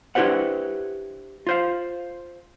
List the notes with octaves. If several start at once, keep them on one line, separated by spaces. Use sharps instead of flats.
D4 E4 G4 B4 C5 F#5
F4 C5 F5